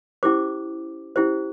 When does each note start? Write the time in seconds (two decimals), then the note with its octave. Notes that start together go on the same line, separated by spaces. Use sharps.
0.23 C#4 E4 G4 C5 D6
1.16 C#4 E4 G4 C5